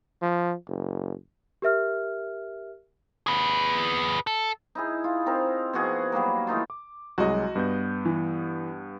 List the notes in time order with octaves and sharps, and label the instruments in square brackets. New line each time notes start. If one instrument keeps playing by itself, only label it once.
[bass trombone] F3
F#1
[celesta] G4 A#4 E5 F6
[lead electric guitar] G#4 B4
A4
[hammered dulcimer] D#4 E4 G#4
F4
C4 D#4 A#4
B2 F3 F#4 G#4
F#3 G3 A#3 A#4
E3 A3 D#4 F4
[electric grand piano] D6
[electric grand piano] C2 F#3 G#3 [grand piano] F#4 D#5
[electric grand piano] G2 B3 G6
[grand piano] E3